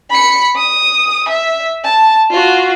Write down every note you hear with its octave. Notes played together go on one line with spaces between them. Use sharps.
B5 C#7
D#6
E5
A5
F4 F#4